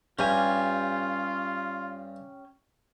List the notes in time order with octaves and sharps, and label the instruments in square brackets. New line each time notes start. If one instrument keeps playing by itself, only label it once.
[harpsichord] G2 [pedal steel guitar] C#4 G4 G#5 [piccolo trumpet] F4